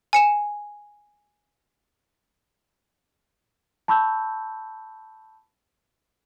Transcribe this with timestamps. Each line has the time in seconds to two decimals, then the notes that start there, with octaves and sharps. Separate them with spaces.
0.13 G#5 C#7 E7
3.88 A5 B5 C#6 E6 G6